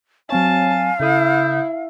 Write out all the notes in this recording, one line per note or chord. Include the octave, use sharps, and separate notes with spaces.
F#3 C4 C#5 F5 G#5 A5
C#3 E4 A4 D#6 G6